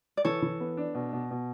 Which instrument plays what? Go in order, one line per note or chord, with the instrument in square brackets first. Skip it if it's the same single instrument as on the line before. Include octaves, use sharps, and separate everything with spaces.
[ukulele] D5
[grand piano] E3 [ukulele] A4 C#5
[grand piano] E3
B3
D4
B2
B2
B2